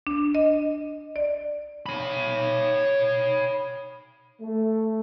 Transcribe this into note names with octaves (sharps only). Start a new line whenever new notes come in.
D4
D#5
D5
C#5 B5
A3